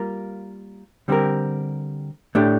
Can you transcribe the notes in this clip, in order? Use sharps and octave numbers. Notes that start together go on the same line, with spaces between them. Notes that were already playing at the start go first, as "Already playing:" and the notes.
Already playing: G3 A#3 F4 A#4
D3 G3 C4 G4 A#4
A2 A3 D4 G4